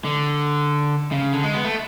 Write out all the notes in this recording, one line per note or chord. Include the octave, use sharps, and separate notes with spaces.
D3
C#3
D3
G#3
B3
A3